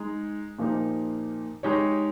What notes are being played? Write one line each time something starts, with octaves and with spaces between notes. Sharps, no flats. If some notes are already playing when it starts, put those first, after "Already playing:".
Already playing: G#3 D#4 G#4
A#2 F3 A#3 D#4 G4
G#3 D#4 G4 C#5